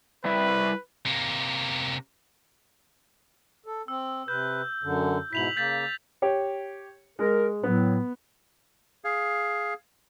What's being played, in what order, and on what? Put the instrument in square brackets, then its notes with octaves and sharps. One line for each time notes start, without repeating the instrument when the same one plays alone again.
[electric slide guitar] G3 E4 E5 [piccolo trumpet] B4
[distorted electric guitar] C3 A#3
[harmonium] A4
[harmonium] C4 [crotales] E6
[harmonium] C3 B4 [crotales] G6
[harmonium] F#2 D3
[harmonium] G#2 B2 E4 [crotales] B6 F7 F#7
[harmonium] C#3 A#3 [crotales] G6 A6 B6
[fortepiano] G4 C#5
[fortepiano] G#3 [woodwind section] A#4
[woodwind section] A2 F#3 [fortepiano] B3
[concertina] G#4 F5